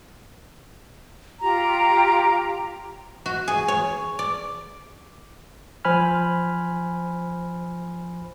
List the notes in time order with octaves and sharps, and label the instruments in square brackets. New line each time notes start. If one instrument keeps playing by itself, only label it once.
[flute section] F4 G4 A#5
[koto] F#4
G#4
C#5
D5
[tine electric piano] F3 C5 G#5 B5 F6